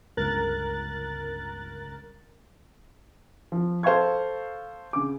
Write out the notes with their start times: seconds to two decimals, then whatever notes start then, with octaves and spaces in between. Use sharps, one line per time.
0.17 G1 C#2 A#4 F#6 A6
3.52 F3
3.83 A4 C5 F5 C6 C#6 G#6
4.93 C#3 D6